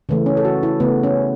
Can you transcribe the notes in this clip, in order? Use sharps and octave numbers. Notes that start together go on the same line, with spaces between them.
C#3 E3 A3
C#4
A4
F#4
E4
C#3 A3 B3
C#4